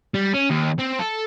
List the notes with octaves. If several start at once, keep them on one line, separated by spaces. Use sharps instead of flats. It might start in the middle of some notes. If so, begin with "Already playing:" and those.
G3
C#4
D#2
C4
A4